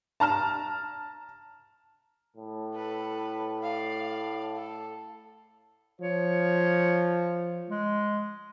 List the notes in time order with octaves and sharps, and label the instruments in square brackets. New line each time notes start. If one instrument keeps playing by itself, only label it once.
[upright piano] A5 A#5 F6 E7
[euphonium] A2
[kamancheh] A4 B4
D5 F5
A4
[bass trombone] F3 [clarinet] C#5
[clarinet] G#3